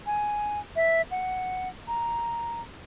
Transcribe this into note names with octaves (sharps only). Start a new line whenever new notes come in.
G#5
E5
F#5
A#5